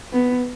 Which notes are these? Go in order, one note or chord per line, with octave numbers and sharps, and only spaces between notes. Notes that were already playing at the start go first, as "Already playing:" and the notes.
B3